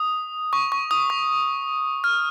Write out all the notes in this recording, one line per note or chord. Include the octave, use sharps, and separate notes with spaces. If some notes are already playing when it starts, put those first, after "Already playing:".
Already playing: D#6
C#6
C#6
D#6
C#6
F6